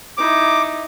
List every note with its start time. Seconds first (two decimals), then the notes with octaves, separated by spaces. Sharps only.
0.17 D#4 E4 D6